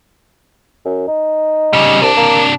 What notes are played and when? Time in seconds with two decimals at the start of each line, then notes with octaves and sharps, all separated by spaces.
0.85 F#2
1.07 D#4
1.73 C#3 G3
2.02 C2 C3 D4
2.17 A#3